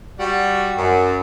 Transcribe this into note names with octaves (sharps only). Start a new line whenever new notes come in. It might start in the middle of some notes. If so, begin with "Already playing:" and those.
G3 F#4
F#2